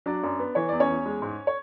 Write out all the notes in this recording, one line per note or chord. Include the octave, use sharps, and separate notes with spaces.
F#3 D4 D5
F#2
B3
E3 C#5
E2 D5
C#4 C#5
E2
G#3
G#2
C#5